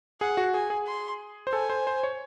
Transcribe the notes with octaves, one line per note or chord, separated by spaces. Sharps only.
G#4 F#5
F#4
G#4 G#5
G#4
C6
C5
A4 G#5
C5
C5
C#5